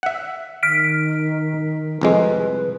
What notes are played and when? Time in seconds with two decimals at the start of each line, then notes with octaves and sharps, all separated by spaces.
0.03 E5 F#5
0.63 D#3 F6 B6 D7
2.01 C2 F2 G#3 B4